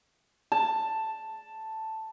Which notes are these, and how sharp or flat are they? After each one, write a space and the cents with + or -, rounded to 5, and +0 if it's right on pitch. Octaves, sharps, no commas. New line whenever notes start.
A5 +5